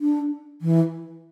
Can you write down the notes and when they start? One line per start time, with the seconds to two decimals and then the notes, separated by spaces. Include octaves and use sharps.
0.01 D4
0.62 E3